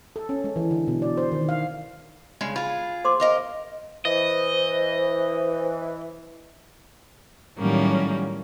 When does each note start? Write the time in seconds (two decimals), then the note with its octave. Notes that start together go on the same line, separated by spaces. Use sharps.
0.16 A4
0.29 C#4
0.44 G#3
0.56 E3
0.71 D3
0.87 B2
1.02 D5
1.17 C5
1.32 D#3
1.49 F5
2.41 G2 C#3 G#3
2.56 F4 G#4 B5
3.05 C5 C6 D6
3.20 A#4 D#5 F5
4.05 E3 C5 D#5
7.58 A2 D#3 F#3 G3 A#3 C#4